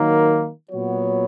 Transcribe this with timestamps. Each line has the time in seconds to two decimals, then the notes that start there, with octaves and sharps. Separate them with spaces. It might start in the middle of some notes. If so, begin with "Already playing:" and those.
Already playing: D#3 F#3 A#3 D#4 A#4
0.70 A#2 F#3 B3 F#4 C#5